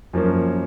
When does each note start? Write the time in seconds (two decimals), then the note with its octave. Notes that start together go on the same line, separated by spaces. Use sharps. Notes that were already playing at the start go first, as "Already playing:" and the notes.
0.13 F#2 F3 A#3 C#4